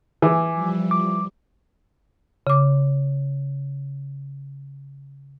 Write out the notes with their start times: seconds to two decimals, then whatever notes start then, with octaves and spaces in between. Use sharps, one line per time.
0.22 E3 G#5 D6
0.53 F3 G3
0.91 D6
2.47 C#3 D6